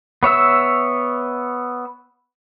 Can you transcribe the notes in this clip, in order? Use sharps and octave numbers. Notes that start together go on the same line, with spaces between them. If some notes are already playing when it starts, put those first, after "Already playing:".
B3 C#5 E5 E6